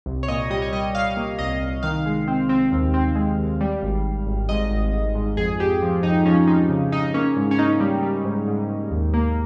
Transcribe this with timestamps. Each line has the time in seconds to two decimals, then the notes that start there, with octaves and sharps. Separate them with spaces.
0.06 C2
0.23 C#5
0.28 A#2 D#5
0.50 G3 D#5
0.62 C#5
0.72 G3 D#5
0.95 G3 F5
1.17 A#3
1.39 C2 D#5
1.61 C2
1.83 D#3 F5
2.06 G#3
2.28 C4
2.49 C4
2.72 D#2
2.94 C4
3.15 G#3
3.38 D#2
3.61 G3
3.82 G#1
4.04 G#1
4.27 G#1
4.49 G#2 D#5
4.71 G#1
4.94 G#2
5.15 G#2
5.37 F2 G#4
5.59 F2 G4
5.82 F3
6.03 F2 D#4
6.26 F3 C#4
6.47 F3 D#4
6.70 C#3
6.92 C#3 D#4
7.14 A#3 C#4
7.36 G#2
7.51 C#4
7.58 A#3 D#4
7.80 G3
8.03 G3
8.25 G#2
8.48 G#2
8.69 G#2
8.91 D#2
9.14 A#3